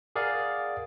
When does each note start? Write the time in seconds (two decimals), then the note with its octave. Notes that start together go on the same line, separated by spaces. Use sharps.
0.16 G#4 A#4 D5 F5 F#5